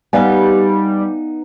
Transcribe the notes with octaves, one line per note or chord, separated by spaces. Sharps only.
G3 B3 D#4 D5 F5 G#5